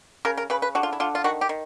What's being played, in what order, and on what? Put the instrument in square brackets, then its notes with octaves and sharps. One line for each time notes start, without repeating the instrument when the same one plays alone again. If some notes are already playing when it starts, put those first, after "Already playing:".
[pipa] C#3 A#4
A#4
C#3 B4
B4
D3 F#4
F4
E4
D3 F4
F4
D#3 F#4
G4
D#3